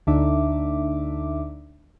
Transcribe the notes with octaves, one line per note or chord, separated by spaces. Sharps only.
D2 D3 D4 D#4 E5 D6